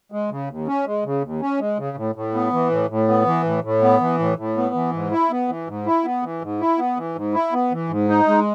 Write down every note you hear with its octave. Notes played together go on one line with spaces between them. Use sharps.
G#3
C#3
D#2
C#4
G#3
C#3
D#2
C#4
G#3
C#3
A2
A2
B3
E3
A2
A2
B3
E3
A2
A2
B3
E3
A2
A2
B3
E3
G#2
E4
B3
E3
G#2
E4
B3
E3
G#2
E4
B3
E3
G#2
E4
B3
E3
G#2
D#4
G#3